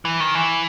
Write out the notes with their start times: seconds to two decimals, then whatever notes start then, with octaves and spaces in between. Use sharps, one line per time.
0.05 E3
0.20 D#3
0.35 E3